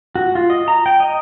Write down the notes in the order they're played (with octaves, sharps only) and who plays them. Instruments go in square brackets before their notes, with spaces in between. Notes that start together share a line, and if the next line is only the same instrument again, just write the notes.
[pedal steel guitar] F#4
F4
D#5
A#5
G5
D#5